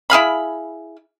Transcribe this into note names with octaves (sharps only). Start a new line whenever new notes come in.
E4 G#4 F5 B5